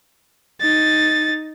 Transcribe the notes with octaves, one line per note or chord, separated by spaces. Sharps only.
D#4 A6